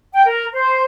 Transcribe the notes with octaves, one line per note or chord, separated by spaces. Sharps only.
G5
A#4
C5